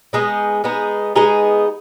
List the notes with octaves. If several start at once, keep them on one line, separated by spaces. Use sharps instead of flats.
G#3 B3 D#4 G#4
G#3 B3 D#4 G#4
G#3 B3 D#4 G#4